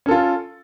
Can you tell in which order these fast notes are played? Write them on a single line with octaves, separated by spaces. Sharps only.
C#4 A4 F4